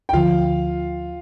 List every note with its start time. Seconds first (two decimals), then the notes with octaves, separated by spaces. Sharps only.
0.09 G5
0.13 D2 D3 F3 F4 F5